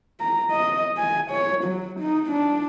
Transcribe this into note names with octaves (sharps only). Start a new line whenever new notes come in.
A#5
D#5
G#5
C#5
F#3
D#4
D4